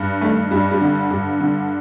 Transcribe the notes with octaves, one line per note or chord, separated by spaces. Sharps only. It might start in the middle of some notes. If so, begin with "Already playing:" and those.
Already playing: G2
D#3 A3
G2 G3
G3
D3
G2
D3